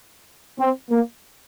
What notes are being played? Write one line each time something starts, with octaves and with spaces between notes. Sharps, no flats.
C4
A#3